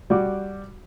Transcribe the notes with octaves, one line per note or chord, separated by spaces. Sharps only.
G3 F#4 D6